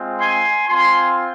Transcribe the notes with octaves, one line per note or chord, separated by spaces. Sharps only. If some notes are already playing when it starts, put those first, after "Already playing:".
Already playing: G#3 C4 F4
G#5 C6
C4 F4 G#5 C6